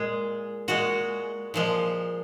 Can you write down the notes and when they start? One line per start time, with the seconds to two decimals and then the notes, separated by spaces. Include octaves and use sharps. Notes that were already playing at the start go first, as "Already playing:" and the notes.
Already playing: A#2 G#3 G#4
0.68 A#2 G#3 F#4
1.54 A#2 F3 G#3